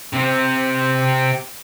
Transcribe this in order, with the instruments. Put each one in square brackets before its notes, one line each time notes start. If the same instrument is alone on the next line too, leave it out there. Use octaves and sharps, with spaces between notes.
[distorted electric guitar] C3 C4